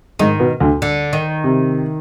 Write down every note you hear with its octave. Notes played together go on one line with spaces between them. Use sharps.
G#2 D#3 G#3
B2 B3
D2 D3
D3
D#3
C3